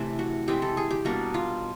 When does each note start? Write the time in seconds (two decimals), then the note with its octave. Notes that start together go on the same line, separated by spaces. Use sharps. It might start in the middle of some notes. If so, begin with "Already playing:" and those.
Already playing: C3 E3 A3 C4
0.19 F#4
0.48 E3 G#3 C4 E4 G4
0.62 A4
0.77 G#4
0.91 G4
1.05 B2 G3 A#3 D4 F#4
1.34 F4